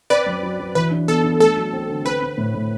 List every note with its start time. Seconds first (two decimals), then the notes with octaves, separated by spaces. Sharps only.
0.10 C4 B4 D5
0.26 F#2
0.43 F#3
0.60 F#3
0.75 E3 B4
0.91 D4
1.08 B3 A4
1.24 D4
1.40 A3 A4
1.57 F#3
1.73 C4
1.89 D3
2.05 C4 B4
2.22 C4
2.38 A2
2.54 A2